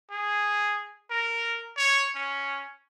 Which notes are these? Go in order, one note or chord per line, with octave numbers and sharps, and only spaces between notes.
G#4
A#4
C#5
C#4